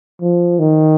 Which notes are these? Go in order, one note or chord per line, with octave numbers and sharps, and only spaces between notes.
F3
D#3